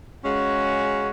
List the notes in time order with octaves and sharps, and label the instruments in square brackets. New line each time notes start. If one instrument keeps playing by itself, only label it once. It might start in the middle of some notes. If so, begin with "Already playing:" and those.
[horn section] C#3 G#3 C#4 F#4